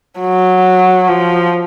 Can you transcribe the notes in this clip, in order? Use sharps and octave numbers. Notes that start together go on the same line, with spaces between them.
F#3
F3